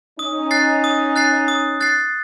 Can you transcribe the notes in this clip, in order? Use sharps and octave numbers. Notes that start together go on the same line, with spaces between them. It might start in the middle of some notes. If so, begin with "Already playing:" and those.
C#4 D#4 D#6
F#6 A6 C7
D#6
F#6 A6 C7
D#6
F#6 A6 C7